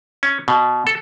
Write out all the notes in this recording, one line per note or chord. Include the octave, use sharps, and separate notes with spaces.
C#4
B2
A4